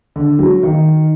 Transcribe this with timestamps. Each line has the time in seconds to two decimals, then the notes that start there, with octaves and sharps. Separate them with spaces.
0.16 D3
0.39 F#3
0.63 D#3